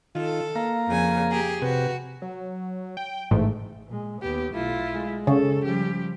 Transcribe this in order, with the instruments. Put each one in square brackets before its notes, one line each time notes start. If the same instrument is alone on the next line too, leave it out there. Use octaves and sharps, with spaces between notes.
[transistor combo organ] D#3 [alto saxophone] F4 [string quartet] A4
[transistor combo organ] A#3 A#5 [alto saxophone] F5
[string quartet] F2 C#3 G#5
G4 G#4
[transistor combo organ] C3 G4 [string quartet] F#4 [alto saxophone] B4
[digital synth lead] F#3
G5
[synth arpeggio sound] A1 G#2 [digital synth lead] A3
[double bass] A#2 G#3
[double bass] D#2 B3 [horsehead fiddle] G4
[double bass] B1 A3 [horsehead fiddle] E4 F4
[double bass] G#3
[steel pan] C#3 [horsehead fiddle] A4
[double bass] F3 G3 [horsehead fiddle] G4